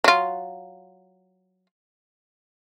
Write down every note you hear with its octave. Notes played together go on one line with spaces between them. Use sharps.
F#3 F4